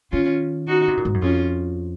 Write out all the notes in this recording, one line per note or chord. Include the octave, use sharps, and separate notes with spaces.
D#3 C#4 F4
D#4 F#4
C3
A#2
G#2
F#2
F2 C#4 F4